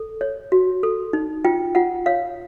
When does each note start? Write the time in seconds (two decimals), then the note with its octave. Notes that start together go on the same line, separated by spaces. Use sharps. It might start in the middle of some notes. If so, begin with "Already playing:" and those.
Already playing: A4
0.21 C#5
0.52 F#4
0.83 A4
1.13 D#4
1.45 F4 G5
1.75 F4 F#5
2.06 C#5 F5